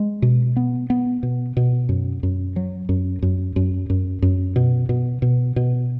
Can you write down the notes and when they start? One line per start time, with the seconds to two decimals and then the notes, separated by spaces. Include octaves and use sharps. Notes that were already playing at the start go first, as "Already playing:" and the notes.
Already playing: G#3
0.22 B2
0.56 B3
0.90 B3
1.23 B2
1.57 B2
1.89 F#2
2.23 F#2
2.56 F#3
2.89 F#2
3.23 F#2
3.56 F#2
3.90 F#2
4.22 F#2
4.56 B2
4.89 B2
5.22 B2
5.56 B2